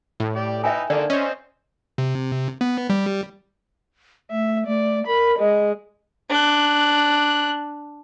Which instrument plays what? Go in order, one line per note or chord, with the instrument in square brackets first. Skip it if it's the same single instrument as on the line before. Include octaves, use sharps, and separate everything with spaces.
[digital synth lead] A2
[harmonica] G4 D5
[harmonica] D#4 E4 B4 [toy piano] E5 G5 G#5
[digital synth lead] D3 [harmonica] D#3 A#3 A4 [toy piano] D5
[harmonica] C4 C5 D#5 [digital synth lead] C#4
[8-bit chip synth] C3
B3
G3
[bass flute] A3 [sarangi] E5
[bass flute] A3 [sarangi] D5
[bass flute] A#4 [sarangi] B5
[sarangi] G#3 [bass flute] D#5
[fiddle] D4 F#6